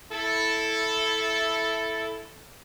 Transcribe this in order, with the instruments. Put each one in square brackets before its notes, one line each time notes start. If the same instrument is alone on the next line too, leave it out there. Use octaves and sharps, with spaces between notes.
[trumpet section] E4 A4